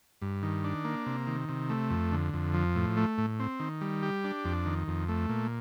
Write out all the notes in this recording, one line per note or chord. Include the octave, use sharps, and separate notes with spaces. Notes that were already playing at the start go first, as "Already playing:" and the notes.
G2
D#3
D4
A#3
C3
D#3
C3
A3
F2
D3
F2
F3
A2
A3
A2
C4
D#3
G3
G4
D4
F2
D#3
F2
A3
A#2